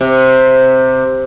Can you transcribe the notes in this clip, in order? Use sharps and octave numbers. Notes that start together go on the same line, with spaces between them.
C3